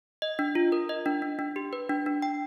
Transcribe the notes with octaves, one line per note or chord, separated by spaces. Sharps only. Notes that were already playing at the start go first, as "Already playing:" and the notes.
D#5
D4
F4
A#4
D#5
D4
D4
D4
G4
B4
D4
D4
G5